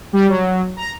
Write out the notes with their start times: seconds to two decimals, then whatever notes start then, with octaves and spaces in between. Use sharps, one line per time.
0.13 G3
0.29 F#3
0.77 A#5